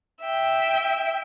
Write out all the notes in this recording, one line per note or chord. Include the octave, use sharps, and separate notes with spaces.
E5 G5